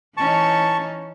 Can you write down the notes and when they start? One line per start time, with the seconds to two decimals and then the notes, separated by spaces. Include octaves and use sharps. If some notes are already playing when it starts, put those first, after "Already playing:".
0.17 E3 C#4 D#4 A5 C#6